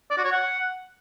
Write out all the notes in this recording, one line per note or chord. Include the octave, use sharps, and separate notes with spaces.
D5
F#4
C#5
F#5